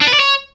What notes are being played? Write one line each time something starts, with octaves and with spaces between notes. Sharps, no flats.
D4
B4
D5
C#5